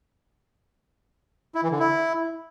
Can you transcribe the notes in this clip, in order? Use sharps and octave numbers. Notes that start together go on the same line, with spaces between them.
E4
E3
D3
E4